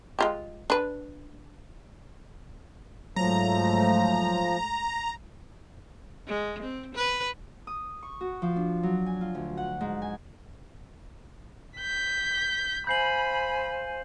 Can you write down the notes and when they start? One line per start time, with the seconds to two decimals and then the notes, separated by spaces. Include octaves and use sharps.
0.19 G#3 F4 G4
0.70 D4 B4
3.16 G#2 F3 F#3 A3 A#5
6.27 G#3
6.63 C4
6.95 B4
7.67 D#6
8.03 C#6
8.21 F#4
8.42 F3
8.56 D4
8.83 F#3
9.06 G#5
9.21 F4
9.35 D2
9.57 F#5
9.81 G#2
10.02 G#5
11.77 G6 B6
12.87 C5 F5 G#5 B5 G6 C7 F#7